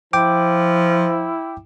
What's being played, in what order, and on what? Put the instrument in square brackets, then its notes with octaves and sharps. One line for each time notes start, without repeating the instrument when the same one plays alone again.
[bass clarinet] F3 [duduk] E4 [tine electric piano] G5 D6